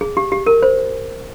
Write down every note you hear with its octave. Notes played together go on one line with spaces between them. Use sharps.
G#4
G4
G4
A#4
C5